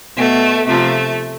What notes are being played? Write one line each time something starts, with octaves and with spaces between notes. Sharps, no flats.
B2 A3
C3 F3 A3